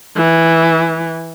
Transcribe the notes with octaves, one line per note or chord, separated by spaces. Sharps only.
E3